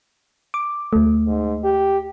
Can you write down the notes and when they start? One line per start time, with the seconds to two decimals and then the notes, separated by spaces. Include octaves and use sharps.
0.54 D6
0.93 D2 A3
1.27 G#2
1.64 G4